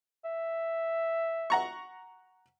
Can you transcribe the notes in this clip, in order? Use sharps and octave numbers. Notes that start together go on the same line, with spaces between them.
E5
F#5 A#5 C#6